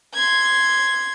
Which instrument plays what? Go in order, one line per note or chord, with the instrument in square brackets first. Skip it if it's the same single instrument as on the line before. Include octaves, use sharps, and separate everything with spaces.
[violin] C6 G#6